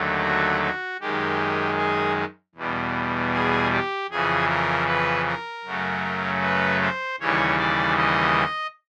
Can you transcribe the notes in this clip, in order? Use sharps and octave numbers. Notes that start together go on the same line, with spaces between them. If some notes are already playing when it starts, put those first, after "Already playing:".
Already playing: D#2 D3 F#3 A3
F#4
F#4
F#2 D#3 G#3 G4
G#4
E2 B2 G3
G#4
G4
F2 C#3 E3 G#4
A#4
B4
A#4
F#2 C#3 F#3 A3
B4
C5
D#2 C#3 E3 G3 C#5
D5
D#5